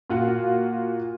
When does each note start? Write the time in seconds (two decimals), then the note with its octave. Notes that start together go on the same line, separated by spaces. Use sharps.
0.10 A#2 F4 F#4